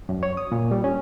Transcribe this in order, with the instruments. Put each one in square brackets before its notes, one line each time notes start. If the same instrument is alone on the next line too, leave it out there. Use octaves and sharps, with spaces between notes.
[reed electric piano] F#2
C#5
D#6
A#2
G3
C#4